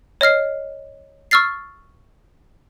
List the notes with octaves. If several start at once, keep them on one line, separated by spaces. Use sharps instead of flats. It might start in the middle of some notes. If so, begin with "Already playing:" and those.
C#5 D#5 F6 C7
C#6 E6 F6 A6 C7